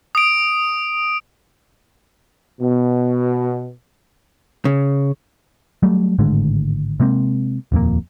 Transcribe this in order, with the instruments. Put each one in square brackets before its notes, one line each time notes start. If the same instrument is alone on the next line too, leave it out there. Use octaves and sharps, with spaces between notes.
[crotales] D#6 D7
[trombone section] B2
[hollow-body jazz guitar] C#3
[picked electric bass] F#3 G3 A3
G#1 A2 D3 G#3
C3 G#3 A#3 C4
D#1 F2 A#2 A#3